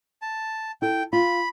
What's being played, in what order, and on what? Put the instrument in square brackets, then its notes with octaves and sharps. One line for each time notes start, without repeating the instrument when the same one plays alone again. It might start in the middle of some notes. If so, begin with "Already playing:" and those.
[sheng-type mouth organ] A5
[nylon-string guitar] E4 A4 [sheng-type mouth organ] G5
[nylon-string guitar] F4 [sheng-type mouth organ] B5